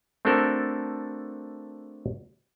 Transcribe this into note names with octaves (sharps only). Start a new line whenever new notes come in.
A3 C4 D4 F#4 A4 A#4